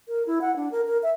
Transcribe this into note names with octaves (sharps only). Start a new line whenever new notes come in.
A#4
E4
F#5
D4
A#4
A#4
E5